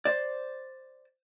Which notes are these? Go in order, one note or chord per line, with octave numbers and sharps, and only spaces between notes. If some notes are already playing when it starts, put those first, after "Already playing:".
C5 D5